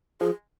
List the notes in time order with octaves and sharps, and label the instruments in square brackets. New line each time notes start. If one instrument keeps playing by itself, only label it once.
[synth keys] F3 [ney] G#4